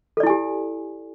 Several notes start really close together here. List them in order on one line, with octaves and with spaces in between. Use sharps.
A4 D5 E4 G#5 G4